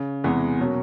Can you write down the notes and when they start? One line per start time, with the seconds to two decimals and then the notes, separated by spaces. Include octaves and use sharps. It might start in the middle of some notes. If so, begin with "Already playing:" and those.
Already playing: C#3
0.24 E2 C3 E3 G#3 B3
0.59 B2 F#3 A#3 C#4 F#4